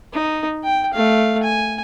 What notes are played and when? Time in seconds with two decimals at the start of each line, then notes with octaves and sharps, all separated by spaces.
0.13 D#4
0.64 G5
0.94 A3 F5
1.43 G#5